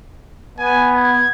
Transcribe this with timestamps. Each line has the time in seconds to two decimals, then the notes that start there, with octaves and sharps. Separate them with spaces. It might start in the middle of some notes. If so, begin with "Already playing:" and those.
0.59 B3 G#5
0.95 G#6